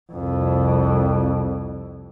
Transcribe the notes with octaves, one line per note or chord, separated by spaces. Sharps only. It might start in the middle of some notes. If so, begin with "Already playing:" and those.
C2 F2